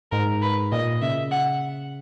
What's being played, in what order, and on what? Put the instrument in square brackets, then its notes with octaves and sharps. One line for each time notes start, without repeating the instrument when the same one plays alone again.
[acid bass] G#2 [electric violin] A#4
[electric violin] B4
[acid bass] A#2 [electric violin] D#5
[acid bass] C#3 [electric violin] E5
[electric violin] F#5